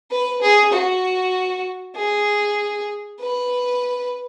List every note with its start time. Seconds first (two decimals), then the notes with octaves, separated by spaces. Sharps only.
0.11 B4
0.42 G#4
0.73 F#4
1.96 G#4
3.20 B4